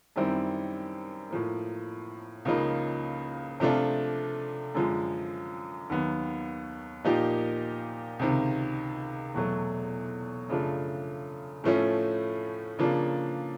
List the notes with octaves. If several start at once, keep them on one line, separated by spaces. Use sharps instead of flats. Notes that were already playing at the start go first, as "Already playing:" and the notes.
F#2 D#3 G3 C4 E4
A2 F3 A#3
C#2 C#3 F3 A#3 D#4
C3 F3 A3 D4 F4
F#2 D3 F3 G#3
D#2 D#3 F#3 B3
A#2 F3 A#3 D#4 G4
C#2 C3 D#3
E2 B2 F#3 A3
F#2 C#3 F3 A3 D4
A2 F3 A3 C#4
C#3 F3 A#3 D4